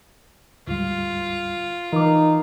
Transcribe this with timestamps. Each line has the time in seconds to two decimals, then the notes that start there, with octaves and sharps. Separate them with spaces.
0.67 D2 G#2 G3 F4
1.93 E3 D#4 A#4 D6